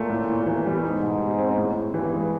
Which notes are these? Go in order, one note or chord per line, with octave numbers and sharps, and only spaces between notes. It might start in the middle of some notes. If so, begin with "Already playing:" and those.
Already playing: A#2 A3
A2
A2
E3
G3
G#2 D#4
B2
G3
C4
A2
A2
G2 E3
G#3